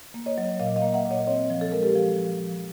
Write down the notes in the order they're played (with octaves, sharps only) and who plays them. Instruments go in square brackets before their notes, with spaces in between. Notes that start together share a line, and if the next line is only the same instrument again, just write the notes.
[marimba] A#3
C#5 D#5
F#3
A#2 D#5 F5
D#5 F5
A#3
E5 F#5
A#2
C#5 D#5
C4 C#5 D#5
F3
A4
G#3 A#4
G4 A4
F3
F3
F3